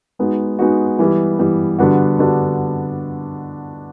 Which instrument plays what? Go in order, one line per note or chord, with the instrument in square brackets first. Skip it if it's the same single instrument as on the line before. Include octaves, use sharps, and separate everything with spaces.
[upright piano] G#3 B3 D#4 F#4
G#3 B3 D#4 F#4
E3 G3 B3
E3 G3 B3
D3 G3 B3 D4 F#4
D3 G3 B3 D4 F#4